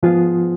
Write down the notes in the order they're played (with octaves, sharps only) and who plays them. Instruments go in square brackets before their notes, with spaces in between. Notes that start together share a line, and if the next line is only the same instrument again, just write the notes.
[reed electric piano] G#2 F3 B3 F4 G#4